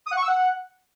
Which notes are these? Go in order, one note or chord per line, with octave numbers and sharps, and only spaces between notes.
D#6
F#5
C#6
E6
F#5